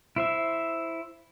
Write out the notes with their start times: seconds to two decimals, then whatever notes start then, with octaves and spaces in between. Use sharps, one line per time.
0.16 E4 C5 E5